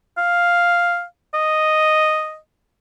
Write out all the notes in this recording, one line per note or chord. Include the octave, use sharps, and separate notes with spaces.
F5
D#5